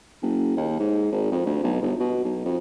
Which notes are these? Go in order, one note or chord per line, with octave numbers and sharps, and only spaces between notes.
F#1
D#2
G#2
G#1
F2
D2
B1
G1
B2
B1
F2